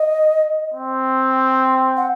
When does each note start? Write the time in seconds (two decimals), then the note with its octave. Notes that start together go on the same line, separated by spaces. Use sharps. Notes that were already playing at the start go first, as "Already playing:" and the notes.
Already playing: D#5
0.74 C4
1.97 F#5